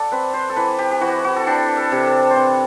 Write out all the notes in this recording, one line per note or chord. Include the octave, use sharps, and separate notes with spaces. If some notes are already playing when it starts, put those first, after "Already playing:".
Already playing: A4 D5 F#5
C4 B4
C5
A4
E3 B4
G4
G4
E3 F#4
F#4
A4
D4 G4
A4
C3
A4
C5
C4 B4